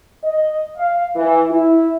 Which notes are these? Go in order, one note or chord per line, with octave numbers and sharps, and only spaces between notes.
D#5
F5
E3
E4